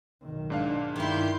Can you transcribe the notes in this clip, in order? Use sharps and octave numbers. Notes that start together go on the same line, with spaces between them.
B1 D#3
G#2 D4 F5
G2 D#3 E4 G4 C6 G6